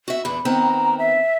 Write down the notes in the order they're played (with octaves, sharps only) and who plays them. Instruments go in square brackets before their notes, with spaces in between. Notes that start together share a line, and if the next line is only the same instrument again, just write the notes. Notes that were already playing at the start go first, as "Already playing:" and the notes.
[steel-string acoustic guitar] F#4 E5
[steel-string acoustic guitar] E2 A#2 D4 [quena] B5
[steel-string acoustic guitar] D#3 B3 C4 [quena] A#5
[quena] E5